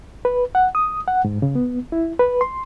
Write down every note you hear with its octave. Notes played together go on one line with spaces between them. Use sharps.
B4
F#5
D#6
F#5
G#2
C#3
B3
E4
B4
C6